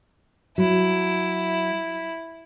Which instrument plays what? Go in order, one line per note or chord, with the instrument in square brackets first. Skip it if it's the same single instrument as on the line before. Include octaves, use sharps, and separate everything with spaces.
[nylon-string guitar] F#3 [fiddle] E4